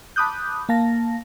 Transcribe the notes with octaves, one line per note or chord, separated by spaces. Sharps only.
A5 B5 D6 D#6 F#6 G6
A#3 F5 A5 A#6